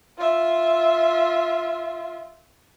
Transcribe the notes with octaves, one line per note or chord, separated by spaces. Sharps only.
F4 E5